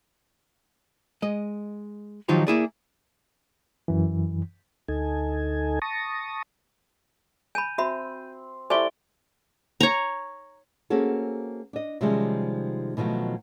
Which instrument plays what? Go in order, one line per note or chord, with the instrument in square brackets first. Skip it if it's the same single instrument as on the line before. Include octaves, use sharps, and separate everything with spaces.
[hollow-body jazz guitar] G#3 D#5
D#3 F3 F#3 D#4 F4 G4
A#3 E4 G#4 D5
[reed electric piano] F#2 E3
[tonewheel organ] D2 D#4 A4 G#5
A5 C#6 D#6 A#6
[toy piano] G#5 B5 [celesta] G6 D#7
[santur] C4 [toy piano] F#4 E5 B5
[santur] A3 E4 [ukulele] G4 D5 [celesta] C5 C6 G7 [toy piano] G#5
[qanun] C#5 A#5
[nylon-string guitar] A#3 C4 C#4 F#4 G#4 A4
D4 D#5
C3 D#3 F3 G3 G#3 C#4
B2 D#3 F3 F#3 A3